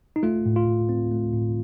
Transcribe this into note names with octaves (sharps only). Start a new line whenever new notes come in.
D#4
A3 F4
A2
F4
A2
C4
A3
A2